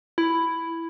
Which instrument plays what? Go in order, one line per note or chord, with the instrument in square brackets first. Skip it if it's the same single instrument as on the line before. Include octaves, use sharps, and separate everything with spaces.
[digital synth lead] E4